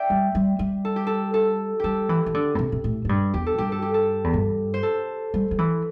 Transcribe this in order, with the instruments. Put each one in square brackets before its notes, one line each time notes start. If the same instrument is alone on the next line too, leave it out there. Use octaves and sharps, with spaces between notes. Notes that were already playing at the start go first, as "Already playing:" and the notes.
Already playing: [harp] D5 E5 G5
[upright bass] G3
G3
G3
[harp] A4
G4
A4
A4
[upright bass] G3 [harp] G4 A4
[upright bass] E3
E3
D3
A2
C3
C3
A2
A2
G2
[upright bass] E2 [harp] G4
[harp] A4
[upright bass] G2 [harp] G4
[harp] A4
G4
A4
[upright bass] E2
G2
[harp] C5
A4
[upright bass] G3
G3
E3